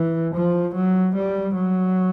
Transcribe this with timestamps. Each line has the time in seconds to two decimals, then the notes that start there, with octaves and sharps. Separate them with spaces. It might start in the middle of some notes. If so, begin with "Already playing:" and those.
Already playing: E3
0.35 F3
0.75 F#3
1.15 G3
1.55 F#3